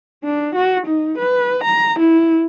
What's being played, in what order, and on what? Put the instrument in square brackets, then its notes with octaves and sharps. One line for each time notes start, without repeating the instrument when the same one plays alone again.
[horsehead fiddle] D4
F#4
D#4
B4
A#5
E4